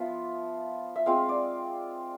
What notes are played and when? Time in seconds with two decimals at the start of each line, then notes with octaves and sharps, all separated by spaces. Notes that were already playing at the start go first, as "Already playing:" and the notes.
Already playing: F3 B3 F4 E5
0.96 E5
1.06 G#3 C4 F4 F5
1.29 D5